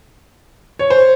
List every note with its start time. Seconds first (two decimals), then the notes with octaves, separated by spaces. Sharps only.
0.79 C#5
0.90 C5